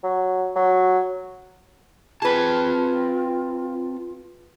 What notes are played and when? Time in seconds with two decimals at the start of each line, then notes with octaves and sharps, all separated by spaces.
0.03 F#3
0.56 F#3
2.22 C4 F4 G#4 B4 A5